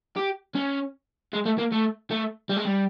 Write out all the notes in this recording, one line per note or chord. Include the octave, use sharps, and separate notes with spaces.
G4
C#4
G#3
A3
A#3
A3
A3
G3
G#3
G3